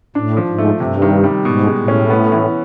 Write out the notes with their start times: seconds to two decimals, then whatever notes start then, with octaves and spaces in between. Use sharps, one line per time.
0.15 A2 D4
0.37 F3
0.48 G#2
0.58 A3
0.80 G2 C3
1.02 D#3
1.24 G3
1.45 G#2 B2
1.67 G#3
1.77 A2
1.88 C#4
2.10 B3
2.32 E3